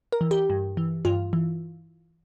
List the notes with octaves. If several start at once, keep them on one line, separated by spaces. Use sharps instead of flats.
A#4
E3
G4
G2
E3
G2 F4
E3